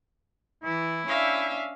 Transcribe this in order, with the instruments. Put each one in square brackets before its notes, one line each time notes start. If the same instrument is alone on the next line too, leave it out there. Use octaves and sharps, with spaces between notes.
[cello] E3 [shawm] E4
[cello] C#4 D4 [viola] E5 F5